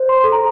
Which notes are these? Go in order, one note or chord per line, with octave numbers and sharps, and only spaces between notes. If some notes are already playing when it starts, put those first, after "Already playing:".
Already playing: C5
C6
A4
A#5